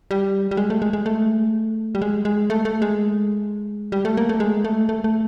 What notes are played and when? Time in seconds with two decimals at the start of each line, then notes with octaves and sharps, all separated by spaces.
0.11 G3
0.51 G3
0.57 G#3
0.70 A3
0.82 G#3
0.93 G#3
1.06 A3
1.95 G3
2.02 G#3
2.25 G#3
2.50 A3
2.65 A3
2.82 G#3
3.92 G3
4.05 A3
4.17 A#3
4.29 A3
4.40 G#3
4.65 A3
4.89 A3
5.04 A3